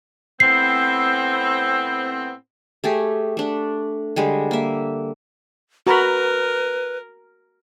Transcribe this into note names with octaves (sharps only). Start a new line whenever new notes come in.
A2 B3 C4 C7
A3 G4 G#4
A3 D4
D3 G3 G#3
A#3 E5
F#4 A#4 B4 A#5 B5